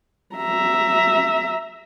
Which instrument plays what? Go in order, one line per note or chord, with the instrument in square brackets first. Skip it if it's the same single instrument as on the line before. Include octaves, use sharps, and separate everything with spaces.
[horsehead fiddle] E5 A#5